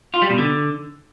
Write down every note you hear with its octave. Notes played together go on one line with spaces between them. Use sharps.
F4
G3
B2
D3